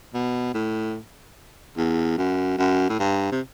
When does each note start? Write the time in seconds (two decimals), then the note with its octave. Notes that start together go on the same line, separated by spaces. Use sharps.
0.14 B2
0.54 A2
1.77 E2
2.18 F#2
2.58 F#2
2.89 A2
2.99 G2
3.32 C3